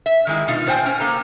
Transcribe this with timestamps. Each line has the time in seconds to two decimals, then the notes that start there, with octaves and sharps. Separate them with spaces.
0.06 E5
0.27 D#3 G#3 E4
0.48 B2 D#4 F4
0.67 A#2 C5 G5 G#5
0.86 C#4
0.99 A#3 A4 C5 A#5